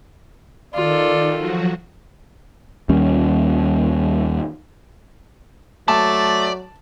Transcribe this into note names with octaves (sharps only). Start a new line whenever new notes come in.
D#3 F4 A4 D5
F3 F#3 F#4
D#2 G3 C#4
F#3 A3 D5 A5